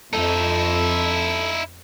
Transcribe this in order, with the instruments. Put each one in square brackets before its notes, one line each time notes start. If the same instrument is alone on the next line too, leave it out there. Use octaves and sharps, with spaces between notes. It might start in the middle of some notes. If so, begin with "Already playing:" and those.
[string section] F2 [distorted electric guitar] D#4 E4 [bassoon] A4